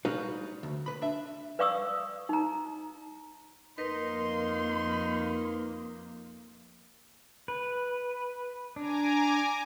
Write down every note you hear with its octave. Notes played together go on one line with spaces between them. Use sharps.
G3 G#3 D#4 F#4 B4 F5
D2
B4 B5
D4 E5
B4 D5 F5 C#6 D#6 E6
D#4 A#5
F2 A#3 D#4 A#4 B4 C6
B4
D4 G#5 A#5 D6